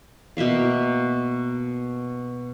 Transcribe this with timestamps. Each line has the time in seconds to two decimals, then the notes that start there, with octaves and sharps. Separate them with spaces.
0.37 B2 A#3 E5 F5